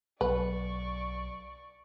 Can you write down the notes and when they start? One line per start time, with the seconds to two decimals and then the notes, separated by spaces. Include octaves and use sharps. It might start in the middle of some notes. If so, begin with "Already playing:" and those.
0.21 B1 B4 D5 C#6